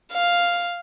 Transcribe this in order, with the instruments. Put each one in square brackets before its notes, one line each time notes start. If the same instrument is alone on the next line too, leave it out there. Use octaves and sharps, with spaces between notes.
[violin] F5